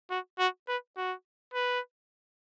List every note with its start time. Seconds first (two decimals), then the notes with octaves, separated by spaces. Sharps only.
0.10 F#4
0.39 F#4
0.68 B4
0.97 F#4
1.54 B4